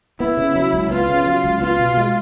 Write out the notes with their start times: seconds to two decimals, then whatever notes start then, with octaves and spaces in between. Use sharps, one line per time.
0.20 B3 E4
0.37 C#3
0.55 F#3
0.73 C#2
0.91 B3 F4
1.08 C#3
1.26 F#3
1.44 C#2
1.61 B3 F4
1.79 B2
1.97 G#3